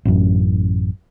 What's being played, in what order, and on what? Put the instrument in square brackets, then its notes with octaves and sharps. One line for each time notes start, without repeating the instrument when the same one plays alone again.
[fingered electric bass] A1 F#2